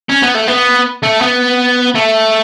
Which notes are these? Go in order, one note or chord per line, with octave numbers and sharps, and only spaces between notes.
C#4
B3
A3
B3
A3
B3
A3